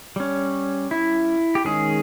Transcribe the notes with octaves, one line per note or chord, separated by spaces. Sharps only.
G3 C#4
E4
G4
D#3 G#3 C#4 G#4